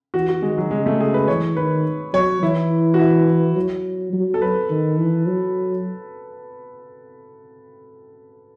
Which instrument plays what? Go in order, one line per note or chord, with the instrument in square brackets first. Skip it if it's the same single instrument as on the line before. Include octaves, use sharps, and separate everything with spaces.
[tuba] E3 [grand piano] F#4
[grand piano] F#4
[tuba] D#3 [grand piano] G#3
[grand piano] F#3
[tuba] C#3 [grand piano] G#3
[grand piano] A3
G#4
B4
[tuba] E3 [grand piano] C#5
[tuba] D#3 [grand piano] B4
[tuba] F#3 [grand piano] C#5
[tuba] E3 [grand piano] E4
[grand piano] F#4
E4
[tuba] F#3
F#3
[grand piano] A4
B4
[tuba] D#3
E3
F#3